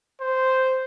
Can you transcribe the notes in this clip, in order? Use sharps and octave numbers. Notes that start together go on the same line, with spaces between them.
C5